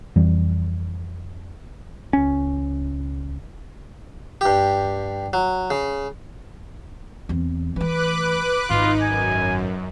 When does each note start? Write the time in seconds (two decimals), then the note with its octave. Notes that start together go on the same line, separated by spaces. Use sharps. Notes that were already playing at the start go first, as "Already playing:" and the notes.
0.16 F2 E3 G3
2.13 C#2 C#4
4.41 G2 G4
5.33 F#3
5.70 C#3
7.29 E2 C4
7.76 E3 A3 B4 D6 F#6
8.70 G#1 D#4 F4
9.03 F#2 G#5